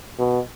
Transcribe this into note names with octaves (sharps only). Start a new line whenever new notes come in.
B2